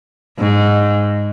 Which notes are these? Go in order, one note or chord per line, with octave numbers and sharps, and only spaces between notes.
G#2